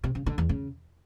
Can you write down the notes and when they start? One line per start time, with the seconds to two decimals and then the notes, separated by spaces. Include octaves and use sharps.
0.04 C3
0.15 C#3
0.26 D3
0.38 E2
0.49 C#3